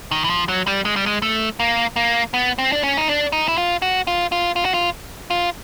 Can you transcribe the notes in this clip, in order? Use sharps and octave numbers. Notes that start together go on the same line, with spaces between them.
D#3
E3
F3
F#3
G3
G#3
G3
G#3
A3
A#3
A#3
B3
C4
D4
C#4
D#4
D4
D#4
E4
F4
F#4
F4
F4
F4
F#4
F4
F4